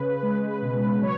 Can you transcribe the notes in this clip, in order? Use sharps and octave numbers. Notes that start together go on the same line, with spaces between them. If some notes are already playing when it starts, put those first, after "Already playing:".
Already playing: C#3 B4
G#3
B2
F#3 C#5